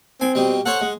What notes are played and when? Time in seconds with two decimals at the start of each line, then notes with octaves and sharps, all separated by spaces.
0.21 C4 G#5
0.35 B2 G3
0.66 A4 C5 C#5 F#5
0.81 G#3